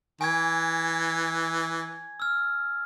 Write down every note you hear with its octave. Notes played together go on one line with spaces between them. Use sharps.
E3 G#5 G#6
E6 F6